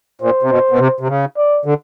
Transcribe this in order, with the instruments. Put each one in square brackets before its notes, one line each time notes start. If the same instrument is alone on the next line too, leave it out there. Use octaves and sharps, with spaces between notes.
[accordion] A#2 [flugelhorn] C5
[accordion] C3
B2
B2
C3
C3
C#3
[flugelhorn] D5
[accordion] D3